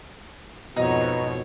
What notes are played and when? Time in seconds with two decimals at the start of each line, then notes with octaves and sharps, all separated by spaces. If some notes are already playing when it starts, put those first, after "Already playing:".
0.76 F2 G#2 B2 D#4 C#5